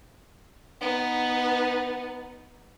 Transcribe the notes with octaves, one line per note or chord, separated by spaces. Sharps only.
B3 D#4